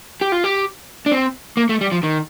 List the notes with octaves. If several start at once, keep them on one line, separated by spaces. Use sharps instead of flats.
G4
F4
G4
D4
C4
A#3
A3
G3
F3
D#3